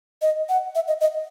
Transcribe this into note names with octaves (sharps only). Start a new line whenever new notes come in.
D#5
F#5
E5
D#5
D#5